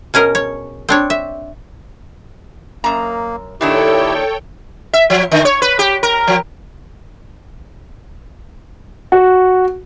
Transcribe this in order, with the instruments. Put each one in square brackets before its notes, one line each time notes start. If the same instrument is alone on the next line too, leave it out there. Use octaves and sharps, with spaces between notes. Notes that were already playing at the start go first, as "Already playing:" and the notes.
[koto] B2 C#4 G#4 A#4
C#5
C4 D4 C#5
E5
[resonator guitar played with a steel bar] F#2 A#5 [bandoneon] A#3
[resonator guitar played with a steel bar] A#2 D#3 D4 [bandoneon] E4 G4 [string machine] A4 C#5 G5
[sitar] E5
F3
D3
C#5
B4
G4
A#4
F3
[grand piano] F#4